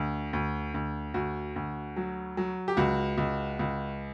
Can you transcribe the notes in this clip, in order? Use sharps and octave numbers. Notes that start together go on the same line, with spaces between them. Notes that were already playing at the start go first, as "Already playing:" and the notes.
Already playing: D2
D2
D2
D2 F#4
D2
F#3
F#3
G4
C#2 F#4
C#2
C#2